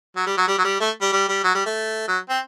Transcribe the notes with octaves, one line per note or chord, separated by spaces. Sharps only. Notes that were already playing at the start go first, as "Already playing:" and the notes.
F#3
G3
F#3
G3
F#3
G3
A3
G3
G3
G3
F#3
G3
A3
F#3
C4